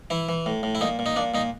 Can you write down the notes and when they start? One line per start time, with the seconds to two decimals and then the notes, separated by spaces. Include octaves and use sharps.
0.10 E3 E4
0.29 E3
0.46 A2
0.63 A2
0.75 E4
0.81 A#2 D#4
0.99 A#2
1.06 D#4
1.16 A#2 D4
1.34 A#2 D#4